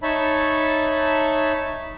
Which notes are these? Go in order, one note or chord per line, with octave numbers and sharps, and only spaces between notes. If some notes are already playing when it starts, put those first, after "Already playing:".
D#4 C#5 E5 A5 B5